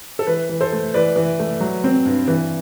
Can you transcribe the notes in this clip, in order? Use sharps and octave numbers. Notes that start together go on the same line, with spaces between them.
A4
E3 B4
E3
A4 C5
A3
E3 B4 D5
E3
A3
F#3
C4
G2
E3